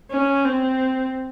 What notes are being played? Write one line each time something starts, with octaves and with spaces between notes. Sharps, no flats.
C#4
C4